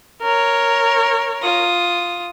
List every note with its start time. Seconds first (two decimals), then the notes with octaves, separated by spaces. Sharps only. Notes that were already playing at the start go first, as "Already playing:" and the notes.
0.22 A#4 C#5
1.42 F4 D#6